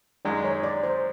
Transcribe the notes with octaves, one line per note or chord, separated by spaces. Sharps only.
F#2 D#3 G#3 D5
C#5
D5
C5